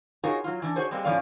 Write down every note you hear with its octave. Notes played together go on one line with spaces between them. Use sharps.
D#4 F4 F#4 G#4 A#4 C#5
F#3 F4
E3 D4
D4 F#4 G#4 C5 C#5
G3 G#3 A#3 C4
A2 F3 B3 C#4 D5 F5